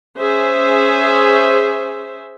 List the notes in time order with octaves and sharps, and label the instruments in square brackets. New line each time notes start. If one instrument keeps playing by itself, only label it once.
[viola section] C#4 G#4 C5 E5